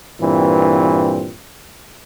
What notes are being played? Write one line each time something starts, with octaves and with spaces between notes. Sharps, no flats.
G2 A#2 E3 C4